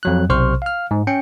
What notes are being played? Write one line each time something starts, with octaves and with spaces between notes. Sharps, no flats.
F2 F#3 F#6
B1 C3 C5 C6 C#6 F6
F5 F6
G#2
C#4 G5 C#7